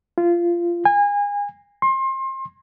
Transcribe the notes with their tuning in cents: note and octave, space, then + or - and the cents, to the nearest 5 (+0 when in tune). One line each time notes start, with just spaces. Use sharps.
F4 -20
G#5 -30
C6 +30